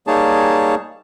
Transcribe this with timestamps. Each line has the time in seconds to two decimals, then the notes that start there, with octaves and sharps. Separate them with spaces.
0.07 G3 A#3 D#4 G#4 C#5 A5